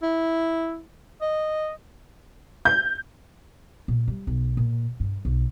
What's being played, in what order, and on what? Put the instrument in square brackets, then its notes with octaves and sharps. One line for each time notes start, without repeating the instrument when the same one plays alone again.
[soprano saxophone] E4
D#5
[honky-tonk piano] G6
[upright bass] A#2
G3
B1
A#2
G2
B1